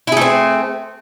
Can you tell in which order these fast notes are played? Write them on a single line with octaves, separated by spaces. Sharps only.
E4 G#4 A3 C4